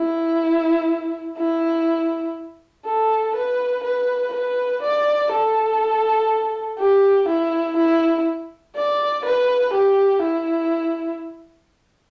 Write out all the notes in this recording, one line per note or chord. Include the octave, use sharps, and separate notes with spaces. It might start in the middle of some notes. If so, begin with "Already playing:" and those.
Already playing: E4
E4
A4
B4
B4
B4
D5
A4
G4
E4
E4
D5
B4
G4
E4